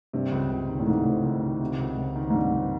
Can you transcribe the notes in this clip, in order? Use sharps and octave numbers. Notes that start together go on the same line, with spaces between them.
G2 C3
C#2
C#2
D#3
A2
G#2 C3
C#2
C#2
D#3
C3
C#2
C#2
D#3
G#2
G2 C3
C#2